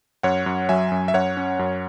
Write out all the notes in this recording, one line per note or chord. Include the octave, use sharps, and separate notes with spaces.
F#2 C#5 F#5
F#2
F#3 E5 G#5
F#2
E5
F#2 C#5 F#5
C#4
F#2